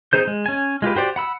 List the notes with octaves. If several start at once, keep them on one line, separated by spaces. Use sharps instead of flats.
C4 D#4 G#4 C5 G6
G#3
C#4 G#5
G#3 F4 G4 B4
F#4 G4 C5 D5
F#5 B5 E6